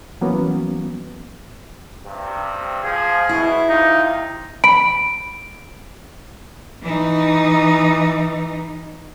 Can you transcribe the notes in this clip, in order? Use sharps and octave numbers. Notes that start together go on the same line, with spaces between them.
E3 F#3 A#3 B3 C#4
G2 C3
F3 G#4
B2 E4
C3 D#4 F4
B5 D7
E3 D#4